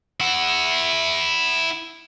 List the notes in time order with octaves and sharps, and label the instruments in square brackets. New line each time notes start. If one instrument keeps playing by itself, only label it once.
[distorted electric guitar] E4 F#5